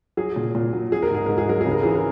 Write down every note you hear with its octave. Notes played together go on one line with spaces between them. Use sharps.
F#3 G#4
A#2
A#2
F#3
F#3 G#4
A#4
G#2 G#4
G#2 A#4
G#4
F#3 A#4
C#3 G#4
A#4
E3 G#4
A#4